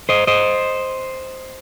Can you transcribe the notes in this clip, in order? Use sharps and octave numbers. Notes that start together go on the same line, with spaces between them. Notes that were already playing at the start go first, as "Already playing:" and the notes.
C5 D#5
C5 D#5